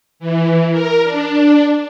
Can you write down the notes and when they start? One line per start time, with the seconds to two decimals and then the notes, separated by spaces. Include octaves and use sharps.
0.20 E3
0.71 A#4
1.03 D4